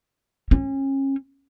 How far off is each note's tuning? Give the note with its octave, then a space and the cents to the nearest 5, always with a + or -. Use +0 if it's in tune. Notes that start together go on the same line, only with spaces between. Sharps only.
C#4 -30